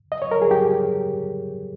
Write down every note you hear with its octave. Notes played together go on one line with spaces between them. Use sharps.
D#5
C#5
A#4
G#4
G4